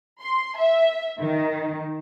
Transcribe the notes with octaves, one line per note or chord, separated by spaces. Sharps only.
C6
E5
D#3